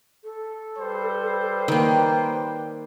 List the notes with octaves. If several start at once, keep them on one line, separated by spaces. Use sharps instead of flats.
A4
G3 B4 C5
D#3 A#3 G5